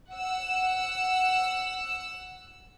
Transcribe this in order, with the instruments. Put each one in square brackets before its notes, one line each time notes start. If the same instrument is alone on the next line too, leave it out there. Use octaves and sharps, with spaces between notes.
[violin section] F#5 E6